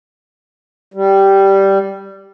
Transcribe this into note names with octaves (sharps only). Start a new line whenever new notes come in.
G3